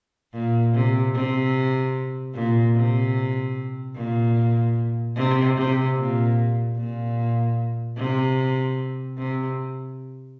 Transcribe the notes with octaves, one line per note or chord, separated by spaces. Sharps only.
A#2
C3
C3
A#2
C3
A#2
C3
C3
A#2
A#2
C3
C3